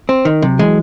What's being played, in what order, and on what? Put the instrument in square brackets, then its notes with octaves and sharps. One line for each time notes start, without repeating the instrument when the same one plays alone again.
[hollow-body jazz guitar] C4
D#3
[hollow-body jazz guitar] C3 [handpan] F#3
[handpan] E3 [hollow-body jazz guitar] G#3